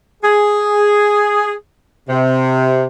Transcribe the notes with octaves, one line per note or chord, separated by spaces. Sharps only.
G#4
C3